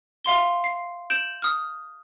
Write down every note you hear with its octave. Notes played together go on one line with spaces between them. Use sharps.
E5 F5 C6 G7
C7
G6 D7 E7 F#7
D#6 F6